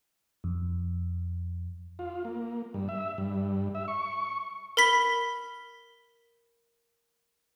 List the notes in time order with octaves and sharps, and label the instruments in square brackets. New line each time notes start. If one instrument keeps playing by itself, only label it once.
[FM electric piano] F2
[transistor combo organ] F4
A#3
G2
E5
G2
E5
C#6
[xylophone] A#4 B5 B6 G7